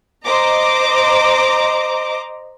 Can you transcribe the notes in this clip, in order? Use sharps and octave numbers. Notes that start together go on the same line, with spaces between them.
C5 D#5 A#5 D6